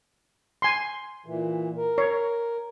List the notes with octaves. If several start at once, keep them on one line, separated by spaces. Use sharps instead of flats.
G#5 C6
A#2 E3
A#4
C#5